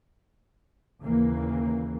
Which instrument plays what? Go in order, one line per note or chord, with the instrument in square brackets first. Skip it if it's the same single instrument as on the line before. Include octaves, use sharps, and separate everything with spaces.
[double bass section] D#2 C#3 E3 A#3